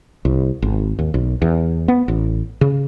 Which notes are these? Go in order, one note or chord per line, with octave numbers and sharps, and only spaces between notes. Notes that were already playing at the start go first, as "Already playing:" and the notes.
C2
G#1
D#2
B1
E2
B3
A1
C#3